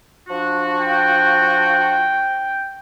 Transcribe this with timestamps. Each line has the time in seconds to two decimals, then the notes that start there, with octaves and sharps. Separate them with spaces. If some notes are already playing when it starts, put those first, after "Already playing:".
0.29 F3 D4 F#4
0.79 G5